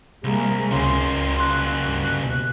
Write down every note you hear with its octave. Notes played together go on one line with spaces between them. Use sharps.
C2 G#3 A#3
C#2 C#3 A#3 C#4 C6
C#2
F#6
D2 G2
B2